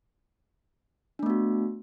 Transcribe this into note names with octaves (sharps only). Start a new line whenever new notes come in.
A3 B3 D4 F#4